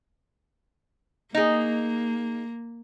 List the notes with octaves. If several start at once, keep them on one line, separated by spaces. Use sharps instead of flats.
A#3 D#4 G#4